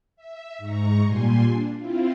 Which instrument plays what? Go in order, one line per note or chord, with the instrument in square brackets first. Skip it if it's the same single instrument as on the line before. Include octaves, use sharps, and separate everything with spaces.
[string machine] E5
G#2 A#5 C#6
A#2 G3 G#5 C6
D4
C4 E4 F4